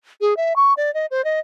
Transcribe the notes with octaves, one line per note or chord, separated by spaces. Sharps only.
G#4
E5
C#6
D5
D#5
C5
D#5